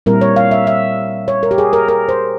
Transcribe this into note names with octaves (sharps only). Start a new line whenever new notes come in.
A#2 G3 C4 E4 A#4
C#5
F5
E5
E5
C#5
A#4
G4
G#4
A#4
A#4
C5